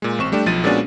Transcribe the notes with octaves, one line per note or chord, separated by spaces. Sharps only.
A#2 G#3
A1 C4 C#6 E7
G3 A3 D4 G4
B1 F3 A6 D#7
A#2 G#3 B3 C#4 D4 F#4